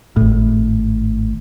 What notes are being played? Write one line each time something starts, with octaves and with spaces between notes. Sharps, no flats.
G#1 A2